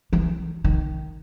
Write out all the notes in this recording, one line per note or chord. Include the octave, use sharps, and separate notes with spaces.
E3
D#3